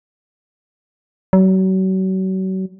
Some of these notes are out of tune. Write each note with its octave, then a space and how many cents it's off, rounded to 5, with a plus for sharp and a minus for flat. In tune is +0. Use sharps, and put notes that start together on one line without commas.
F#3 +35